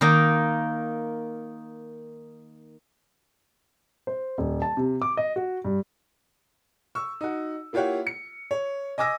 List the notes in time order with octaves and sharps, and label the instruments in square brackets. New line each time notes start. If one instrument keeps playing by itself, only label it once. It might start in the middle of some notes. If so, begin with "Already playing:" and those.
[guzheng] D#3 A#3 D#4
[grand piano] C5
D#1
A5
C3
D6
D#5
F#4
G2
C#6 E6
D#4 F#4
A#3 E4 F4 G4 C#5 F#5
C#7
C#5
D#5 G#5 D6 E6 A#6